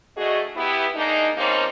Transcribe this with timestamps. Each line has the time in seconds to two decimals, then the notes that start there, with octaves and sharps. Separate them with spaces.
0.17 D2 A3 F#4 G#4 D#5
0.56 B3 E4 G4
0.95 G#3 A#3 D4 D#4
1.37 F3 G3 A#3 C4 C#4 D#4